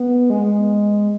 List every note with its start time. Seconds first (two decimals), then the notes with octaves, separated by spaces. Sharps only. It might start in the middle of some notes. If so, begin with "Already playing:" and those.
Already playing: B3
0.30 G#3